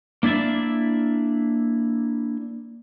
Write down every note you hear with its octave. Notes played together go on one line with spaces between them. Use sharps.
A#3 D4 E4 D5 E5